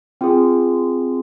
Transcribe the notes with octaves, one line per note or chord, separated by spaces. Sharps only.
C4 F4 G#4